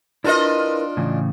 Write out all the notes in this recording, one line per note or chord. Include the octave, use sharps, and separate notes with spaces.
D4 E4 F4 A#4 B4 D#5
A2 C#3 E3